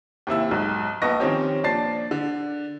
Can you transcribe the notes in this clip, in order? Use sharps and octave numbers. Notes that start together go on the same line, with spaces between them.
D#2 C3 E4 E6
B1 G#2
A#1 B3 D#5 A5 C#6 A#6
D#3 F3 C4 C#4 G4
A#2 F3 D4 A5 A6 C7
D3